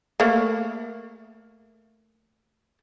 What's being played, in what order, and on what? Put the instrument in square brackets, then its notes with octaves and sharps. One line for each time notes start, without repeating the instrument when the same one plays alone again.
[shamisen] A3 A#3